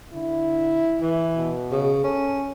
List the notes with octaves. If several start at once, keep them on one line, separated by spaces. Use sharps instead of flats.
D3 E4
E3
B2
C#3
C#4 A4